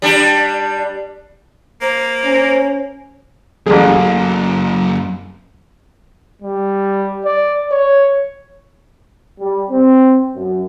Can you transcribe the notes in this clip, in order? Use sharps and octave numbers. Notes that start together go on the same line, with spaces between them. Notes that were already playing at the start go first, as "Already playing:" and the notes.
G3 D4 G4
A#3 C5
C#4
A1 F#2 A#3 G#4
G3
D5
C#5
G3
C4
F#2